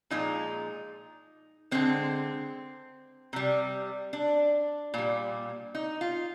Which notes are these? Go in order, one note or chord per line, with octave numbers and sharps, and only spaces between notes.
A#2 F3 G#3 D#4
D3 G#3 C4
C3 G3
D4
A#2 G3
D#4
F4